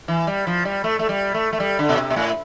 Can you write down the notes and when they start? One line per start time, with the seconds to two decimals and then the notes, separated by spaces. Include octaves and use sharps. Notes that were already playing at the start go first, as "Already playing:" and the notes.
0.08 E3
0.27 G3
0.47 F3
0.65 G3
0.84 A3
0.99 A3
1.09 G3
1.34 A3
1.53 A3
1.60 G3
1.79 D3
1.89 B2
1.97 C3
2.10 B2
2.16 A2